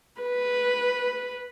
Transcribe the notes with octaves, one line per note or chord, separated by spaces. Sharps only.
B4